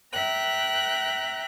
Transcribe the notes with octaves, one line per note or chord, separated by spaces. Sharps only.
E5 G5 A#5 F#6